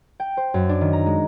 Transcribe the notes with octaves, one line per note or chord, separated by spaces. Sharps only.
G5
C5
F#2
D4
D#3
A#5
G#3